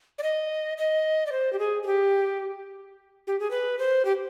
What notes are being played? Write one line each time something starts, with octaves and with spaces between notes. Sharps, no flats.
D5
D#5
D#5
D5
C5
G4
G#4
G#4
G4
G4
G#4
B4
C5
G4